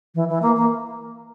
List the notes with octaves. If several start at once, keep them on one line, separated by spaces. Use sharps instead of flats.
E3
E3
A#3
A#3